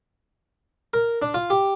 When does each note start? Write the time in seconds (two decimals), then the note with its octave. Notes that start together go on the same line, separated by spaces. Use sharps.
0.94 A#4
1.22 D4
1.34 F4
1.50 G4